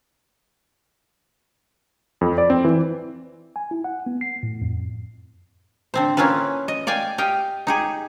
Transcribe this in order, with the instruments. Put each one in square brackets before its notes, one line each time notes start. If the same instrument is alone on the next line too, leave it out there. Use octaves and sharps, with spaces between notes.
[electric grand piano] F2
D5
C4
E3
[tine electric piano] G#5
E4
F#5
B3
C7
A2
F2
[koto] D3 C4 C5
A#3 C#4 E4 F4 B4
D#5
D5 F5 G5 G#5
G4 D#5 F5 G5
D#4 G4 G#4